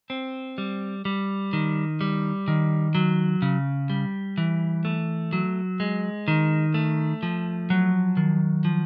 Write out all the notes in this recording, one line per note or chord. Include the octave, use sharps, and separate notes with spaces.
C4
G3
G3
D#3
G3
D#3
F#3
C#3
G3
E3
A3
F#3
G#3
D#3
A3
F3
F#3
D#3
F3